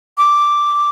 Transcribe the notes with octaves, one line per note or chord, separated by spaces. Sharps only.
D6